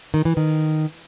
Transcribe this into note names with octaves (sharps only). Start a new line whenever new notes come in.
D#3
E3
D#3